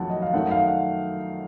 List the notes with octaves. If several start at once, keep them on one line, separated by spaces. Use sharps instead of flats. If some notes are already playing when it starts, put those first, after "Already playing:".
Already playing: F2 D#3 F#3 A3 F#5 A5
D#5
F5
F#2 D#3 A3 D#4 F#5
F5
F#5